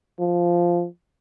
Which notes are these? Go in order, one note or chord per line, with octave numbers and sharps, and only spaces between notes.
F3